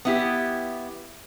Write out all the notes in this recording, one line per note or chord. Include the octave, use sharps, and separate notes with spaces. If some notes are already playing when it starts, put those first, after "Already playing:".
B3 E4 G4